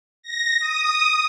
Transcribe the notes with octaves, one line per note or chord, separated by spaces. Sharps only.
A#6
D#6